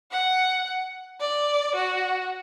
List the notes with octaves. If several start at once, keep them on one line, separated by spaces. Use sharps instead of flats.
F#5
D5
F#4